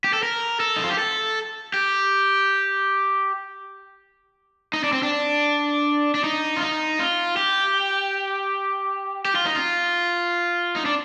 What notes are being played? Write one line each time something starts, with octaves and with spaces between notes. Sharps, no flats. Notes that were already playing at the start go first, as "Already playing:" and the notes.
G4
A4
A#4
A4
D#4
F4
G4
A4
G4
D#4
D4
C4
D4
D4
D#4
F4
D#4
F4
G4
G4
F4
D#4
F4
D#4
D4